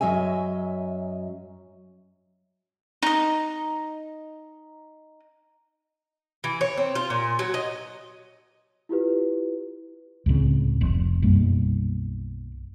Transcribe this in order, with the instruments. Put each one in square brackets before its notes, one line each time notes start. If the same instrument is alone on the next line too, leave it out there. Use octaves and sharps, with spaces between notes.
[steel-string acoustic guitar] F#2 F#3 D#5 E5 G#5
[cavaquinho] D#4 D#5
[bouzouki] E3
C#5
C4
F4
A#2
F#3
D#5
[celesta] E4 F4 G4 B4
[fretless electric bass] C#2 A2 C#3 C4
F1
B1 F#2 G3 A#3